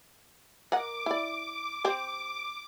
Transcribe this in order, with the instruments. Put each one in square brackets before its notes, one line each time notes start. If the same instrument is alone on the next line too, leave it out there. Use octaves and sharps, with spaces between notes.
[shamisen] A#4 D#5 F#5 [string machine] D6
[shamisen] E4 D5
C4 G4 C5